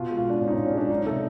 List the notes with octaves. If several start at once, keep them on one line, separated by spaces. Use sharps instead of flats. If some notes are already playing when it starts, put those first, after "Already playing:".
Already playing: B2 F4
G#3
F4
G#3 D4
B2 C#4
D#4
B2 D4
C#4
G#3 D4
F#3 D#4
C3 A4